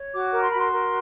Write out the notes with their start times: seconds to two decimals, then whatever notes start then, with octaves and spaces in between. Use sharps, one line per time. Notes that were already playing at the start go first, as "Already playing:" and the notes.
Already playing: C#5
0.13 F#4 D6
0.32 A#4
0.42 C6
0.50 F#4 B5
0.57 C6
0.72 A#4